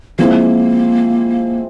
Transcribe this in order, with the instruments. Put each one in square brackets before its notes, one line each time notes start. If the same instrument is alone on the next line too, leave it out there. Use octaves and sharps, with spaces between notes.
[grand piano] F3 G#3 C4 E4 [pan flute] A#3